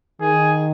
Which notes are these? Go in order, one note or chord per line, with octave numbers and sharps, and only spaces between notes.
D#3 G#4